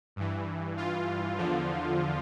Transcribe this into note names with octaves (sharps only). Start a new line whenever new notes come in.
G2 E3
F4
E2 D3 F3